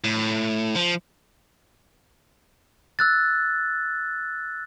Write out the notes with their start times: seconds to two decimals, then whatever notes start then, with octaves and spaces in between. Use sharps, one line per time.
0.04 A2
0.76 F3
2.99 E6 F#6 A6